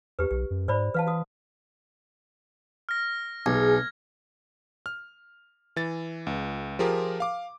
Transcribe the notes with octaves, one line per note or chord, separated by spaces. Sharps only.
E2 G4 B4
B1 G4
F#2
G#2 C5 D5 B5
E3 B4 F5 A5
F#4 D#6
F6 A#6
B1 G#4 G#6
F6
E3 A6
C#2
F3 F4 G4 G#4 A#4
F5 D6